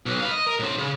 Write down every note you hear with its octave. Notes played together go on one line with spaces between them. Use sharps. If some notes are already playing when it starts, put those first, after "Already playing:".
B1
B4 F5
D#5
A#4
A2 C4
C#3